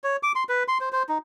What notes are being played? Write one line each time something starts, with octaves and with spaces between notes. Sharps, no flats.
C#5
D6
C6
B4
C6
C5
C5
D#4